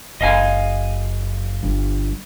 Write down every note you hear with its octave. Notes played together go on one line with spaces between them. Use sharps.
F#1 D#5 F5 G#5
G1 G2